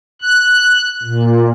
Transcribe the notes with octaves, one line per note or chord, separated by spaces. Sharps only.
F#6
A#2